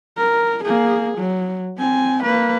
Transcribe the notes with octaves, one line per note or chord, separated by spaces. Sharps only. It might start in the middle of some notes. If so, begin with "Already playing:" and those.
A#4
A#3 G#4
F#3
C4 G#5
A#3 B4